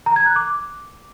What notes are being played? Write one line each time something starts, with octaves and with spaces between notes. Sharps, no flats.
A#5
G#6
F#6
D6